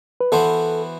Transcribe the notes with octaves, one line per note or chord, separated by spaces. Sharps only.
B4
E3 B3 F#4 A4 C5